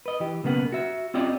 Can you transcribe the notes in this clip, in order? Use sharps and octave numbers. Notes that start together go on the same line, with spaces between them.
B4 D#5
E3 G4
B1 C#3 A#3 B3 F#5
F#4 E5
C4 C#4 F4 G4 D5 D#5